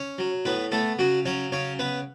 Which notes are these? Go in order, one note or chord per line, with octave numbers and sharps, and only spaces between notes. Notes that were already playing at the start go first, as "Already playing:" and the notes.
Already playing: C#4 C#5
F#3
A2 B3 B4
A3 B3 A4
C#3 F#3 F#4
F#3 C#4 C#5
C#3 C#4 C#5
B3 B4